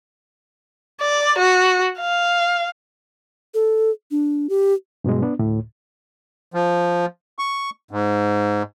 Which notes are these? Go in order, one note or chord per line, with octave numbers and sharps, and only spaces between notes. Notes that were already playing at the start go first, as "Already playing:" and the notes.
D5
F#4
F5
A4
D4
G4
G2 B2 F#3 G#3
B3 D4
D2 A2
F3
C#6
G#2